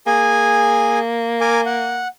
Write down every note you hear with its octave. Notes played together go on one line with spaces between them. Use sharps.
A#3 G#4 G#5
A#4 G#5 D6
F#5